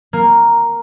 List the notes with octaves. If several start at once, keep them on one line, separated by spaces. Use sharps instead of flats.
A#3